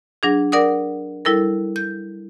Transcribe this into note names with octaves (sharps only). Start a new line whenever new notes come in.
F#3 D4 G#4
A#4 D5 F#5 D6 D#6
G3 E4 A4 A#4
G6